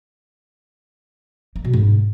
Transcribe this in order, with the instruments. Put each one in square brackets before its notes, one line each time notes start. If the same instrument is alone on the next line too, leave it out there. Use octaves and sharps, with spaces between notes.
[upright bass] A#3
B2
G#2